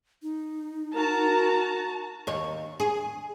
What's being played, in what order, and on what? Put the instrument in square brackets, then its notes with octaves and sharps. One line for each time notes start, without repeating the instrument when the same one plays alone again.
[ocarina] D#4
[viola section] F#4 A5 A#5 [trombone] A#4
[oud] D#2 C#5
G#4